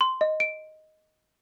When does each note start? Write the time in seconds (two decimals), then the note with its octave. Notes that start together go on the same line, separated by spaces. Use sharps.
0.01 C6
0.21 D#5
0.40 D7